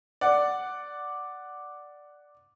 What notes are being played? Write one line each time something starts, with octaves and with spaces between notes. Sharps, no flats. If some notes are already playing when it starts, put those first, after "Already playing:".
D5 F#5